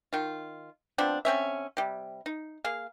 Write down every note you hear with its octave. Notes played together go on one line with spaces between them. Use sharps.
D#3 F4
F3 B3 C4 D4
D3 C4 C#4 E5
C3 G3
D#4
A#3 G#4 F5